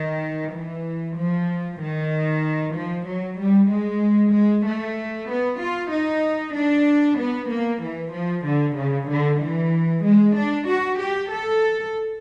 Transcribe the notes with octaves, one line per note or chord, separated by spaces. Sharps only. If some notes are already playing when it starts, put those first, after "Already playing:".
Already playing: D#3
E3
F3
D#3
F3
F#3
G3
G#3
G#3
A3
B3
F4
D#4
D4
B3
A#3
E3
F3
D3
C#3
D3
E3
G#3
D4
F#4
G4
A4